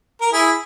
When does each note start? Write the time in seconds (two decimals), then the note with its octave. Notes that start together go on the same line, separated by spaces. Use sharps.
0.21 A#4
0.32 E4 G#4